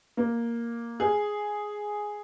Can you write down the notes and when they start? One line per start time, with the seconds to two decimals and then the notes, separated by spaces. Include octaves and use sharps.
0.17 A#3
1.00 G#4